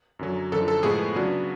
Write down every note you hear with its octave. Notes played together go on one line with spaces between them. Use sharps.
F#2 D3 F#3
F#2 D3 F3 A4
A4
A2 F3 G#3 B3 G#4
C#3 F#3 B3 D4